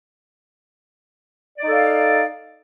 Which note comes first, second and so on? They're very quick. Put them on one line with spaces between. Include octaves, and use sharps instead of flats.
D5 D#4 A4 F5